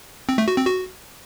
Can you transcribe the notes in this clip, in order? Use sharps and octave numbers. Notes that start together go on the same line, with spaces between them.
C4
A3
F#4
C4
F#4